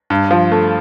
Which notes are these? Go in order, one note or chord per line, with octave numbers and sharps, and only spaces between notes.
G2
F3
A3